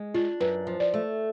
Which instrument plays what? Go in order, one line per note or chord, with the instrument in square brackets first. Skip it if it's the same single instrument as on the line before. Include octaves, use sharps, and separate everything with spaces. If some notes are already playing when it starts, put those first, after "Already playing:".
Already playing: [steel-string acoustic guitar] G#3
[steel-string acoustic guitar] D4 [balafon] F4
[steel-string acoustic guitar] F#2 [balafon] B4
[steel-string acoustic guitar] F3
[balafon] D5
[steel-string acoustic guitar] A3